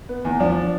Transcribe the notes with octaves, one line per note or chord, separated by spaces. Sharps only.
B3
E2
F3 D4